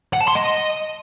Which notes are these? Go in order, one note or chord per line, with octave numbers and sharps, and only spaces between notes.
F#5
A5
C6
D#5